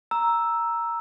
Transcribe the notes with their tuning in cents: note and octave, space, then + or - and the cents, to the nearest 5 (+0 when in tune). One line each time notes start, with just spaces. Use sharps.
A#5 +0 E6 +0